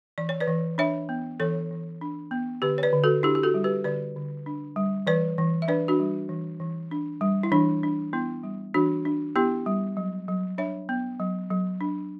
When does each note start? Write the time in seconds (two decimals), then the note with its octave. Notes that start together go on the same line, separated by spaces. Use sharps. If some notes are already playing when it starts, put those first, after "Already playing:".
0.18 E3 D5
0.29 C#5
0.40 B4 D5
0.48 E3
0.78 D4 C#5 E5
1.09 B3
1.40 E3 A4 C#5
1.71 E3
2.01 D4
2.31 B3
2.62 D3 G4 B4
2.78 C#5
2.83 B4 D5
2.93 D3
3.04 F#4 A4
3.23 D4 E4 G4
3.35 G4
3.43 F#4 A4
3.54 G3
3.64 G4 B4
3.84 D3 B4 D5
4.16 D3
4.46 D4
4.76 G3
5.07 E3 B4 D5
5.38 E3
5.62 E5
5.68 D4 B4 D5
5.88 D4 F#4
6.00 G3
6.29 E3
6.60 E3
6.91 D4
7.21 G3
7.43 E4
7.52 E3 D4
7.83 D4
8.13 B3 E4
8.43 G3
8.74 E3 D4 F#4
9.05 D4
9.36 B3 E4 G4
9.66 G3
9.97 F#3
10.28 F#3
10.58 D4 C#5 E5
10.89 B3
11.20 F#3
11.51 F#3
11.81 D4